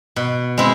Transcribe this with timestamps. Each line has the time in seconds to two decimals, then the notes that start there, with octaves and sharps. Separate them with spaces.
0.16 B2
0.58 G#3 C4 E4